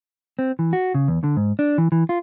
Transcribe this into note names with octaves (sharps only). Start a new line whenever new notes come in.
C4
E3
F#4
C#3
E2
D3
G#2
D4
E3
E3
F4